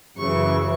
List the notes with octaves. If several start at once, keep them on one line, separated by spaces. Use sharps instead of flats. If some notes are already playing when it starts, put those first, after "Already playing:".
F#2 C#3 E3 C#6